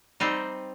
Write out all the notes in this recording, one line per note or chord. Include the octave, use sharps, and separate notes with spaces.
G3 C4 D#4